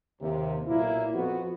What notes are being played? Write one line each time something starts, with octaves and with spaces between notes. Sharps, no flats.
D#2 C3
B1 A#2 A#3 E4
F2 B3 F#4